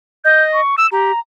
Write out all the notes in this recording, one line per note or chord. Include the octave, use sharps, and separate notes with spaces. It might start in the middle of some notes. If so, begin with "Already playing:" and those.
D#5 G6
C#6
E6 E7
G4 A#5